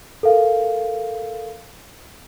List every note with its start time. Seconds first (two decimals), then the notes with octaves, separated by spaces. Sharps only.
0.23 A4 A#4 F5